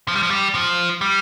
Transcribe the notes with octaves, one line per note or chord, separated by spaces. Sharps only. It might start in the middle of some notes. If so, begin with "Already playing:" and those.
F3
G3
F3
G3
F3
G3